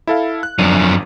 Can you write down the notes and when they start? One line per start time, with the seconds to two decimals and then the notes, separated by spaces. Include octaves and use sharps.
0.07 E4 A4 F5
0.43 F#6
0.59 G1 F#2 F3 D4 D#7